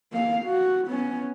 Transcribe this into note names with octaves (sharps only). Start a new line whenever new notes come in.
A#3 F5
F#4
B3 C#4